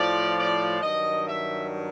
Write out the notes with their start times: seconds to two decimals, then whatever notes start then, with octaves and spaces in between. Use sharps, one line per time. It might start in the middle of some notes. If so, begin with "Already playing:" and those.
Already playing: A2 F3 D5
0.37 D5
0.81 G2 D#3 F#3 D#5
1.26 E5